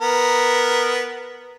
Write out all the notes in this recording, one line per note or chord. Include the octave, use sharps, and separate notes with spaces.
B3 A#4